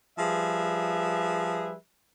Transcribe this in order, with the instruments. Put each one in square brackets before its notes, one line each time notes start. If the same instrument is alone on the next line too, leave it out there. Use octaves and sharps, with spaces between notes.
[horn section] F3 G3 G#4 B4 E5